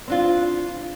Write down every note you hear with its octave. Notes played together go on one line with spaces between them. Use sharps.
C4 D4 F4